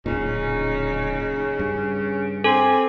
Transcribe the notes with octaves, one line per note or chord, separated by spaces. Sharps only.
D1 G1 A#2 C#3 C#4 D#4
G2
C4 A4 G#5